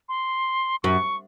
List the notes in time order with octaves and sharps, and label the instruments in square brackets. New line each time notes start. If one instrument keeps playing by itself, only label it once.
[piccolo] C6
[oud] F#2 [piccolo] C#6